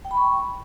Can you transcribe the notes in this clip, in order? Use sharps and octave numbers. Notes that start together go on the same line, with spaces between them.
G5
B5
C#6